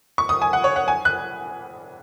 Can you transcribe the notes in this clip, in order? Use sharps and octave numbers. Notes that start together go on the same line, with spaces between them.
C#6
D#6
G#5
F#5
C#5
F#5
G#5
F#6